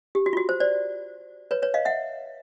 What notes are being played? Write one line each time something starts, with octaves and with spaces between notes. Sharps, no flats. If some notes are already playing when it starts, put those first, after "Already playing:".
G4
F#4
F4
F#4
C5
C5 D5
B4 C#5
B4 C#5
D#5 F5
E5 F#5